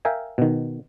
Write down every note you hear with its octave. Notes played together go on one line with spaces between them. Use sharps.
A#4 E5 F5 G5 G#5
B2 D#3